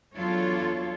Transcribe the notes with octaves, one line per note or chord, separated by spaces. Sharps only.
E2 F#3 D4 F4 A4 C#5